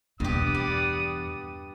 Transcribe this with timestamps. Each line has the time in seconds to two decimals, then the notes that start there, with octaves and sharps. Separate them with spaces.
0.20 E2 G2 B2 G4 D5 F#5 D#6
0.55 G3